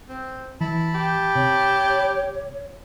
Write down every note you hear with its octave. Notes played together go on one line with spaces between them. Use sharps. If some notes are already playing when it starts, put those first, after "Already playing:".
C4
E3 E4 A5 B5
G4
C3 C#5